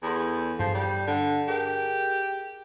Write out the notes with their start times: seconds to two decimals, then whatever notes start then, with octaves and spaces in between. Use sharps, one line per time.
0.03 E2 A4 C6 G#6
0.59 G2 F3 G6
0.74 G3
1.07 D3
1.48 G4 G#4 A#4